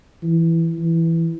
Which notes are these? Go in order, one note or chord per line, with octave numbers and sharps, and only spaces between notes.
E3
E3